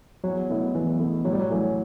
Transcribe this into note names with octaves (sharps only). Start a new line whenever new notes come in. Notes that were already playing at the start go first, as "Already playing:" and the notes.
E2 F#3
B2 A3 E4
E2 E3
B2 A3 E4
A2 F#3
G3
F#3
E3 A3 C#4